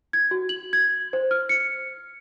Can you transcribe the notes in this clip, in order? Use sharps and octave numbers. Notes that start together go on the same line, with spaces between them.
G#6
F#4
F#7
G#6
C5
F6
C#7